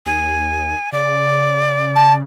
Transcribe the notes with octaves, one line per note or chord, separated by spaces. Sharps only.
D#2 G#5
C#3 D5
A5